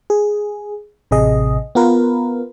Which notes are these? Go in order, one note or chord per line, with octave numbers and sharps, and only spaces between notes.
G#4
A1 C3 G#4 D#5
B3 F4 A#4 B4